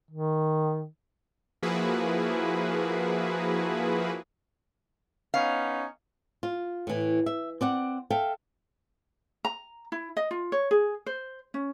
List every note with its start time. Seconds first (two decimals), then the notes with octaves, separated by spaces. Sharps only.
0.11 D#3
1.63 F3 A#3 E4 F#4 G#4 B4
5.34 B3 C#4 D#4 F5
6.43 F4
6.87 A2 E3
7.26 E5
7.61 C4 D5 F#5
8.10 A4 E5 F5 G5
9.45 A#5
9.92 E4
10.17 D#5
10.31 F4
10.52 C#5
10.71 G#4
11.06 C5
11.54 C#4